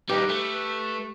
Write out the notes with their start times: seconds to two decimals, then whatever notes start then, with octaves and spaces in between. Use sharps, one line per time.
0.09 G3 D#4 G4 B4
0.29 A3